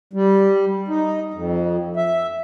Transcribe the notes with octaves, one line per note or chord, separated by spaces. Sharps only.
G3
D#4
F2
E5